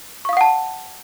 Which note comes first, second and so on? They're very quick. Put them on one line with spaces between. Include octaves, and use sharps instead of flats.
C#6 F5 D#6 F#5 A5